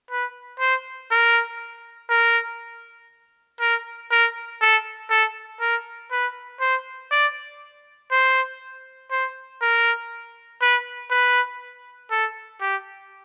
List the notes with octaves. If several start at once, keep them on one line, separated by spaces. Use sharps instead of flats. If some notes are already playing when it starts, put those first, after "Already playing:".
B4
C5
A#4
A#4
A#4
A#4
A4
A4
A#4
B4
C5
D5
C5
C5
A#4
B4
B4
A4
G4